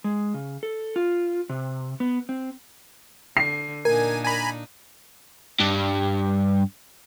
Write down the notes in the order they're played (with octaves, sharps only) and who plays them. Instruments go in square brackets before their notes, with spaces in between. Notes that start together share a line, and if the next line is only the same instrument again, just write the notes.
[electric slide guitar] G#3
C#3
A4
F4
C3
B3
C4
[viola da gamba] D3 [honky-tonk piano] C7
[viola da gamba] A#2 D4 D#4 [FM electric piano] A#4 [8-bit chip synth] G#5
[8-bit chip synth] G#5 A#5 B5
[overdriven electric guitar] G2